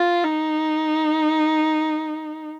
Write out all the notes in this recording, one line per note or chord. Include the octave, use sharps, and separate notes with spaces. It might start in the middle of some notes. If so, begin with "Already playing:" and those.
Already playing: F4
D#4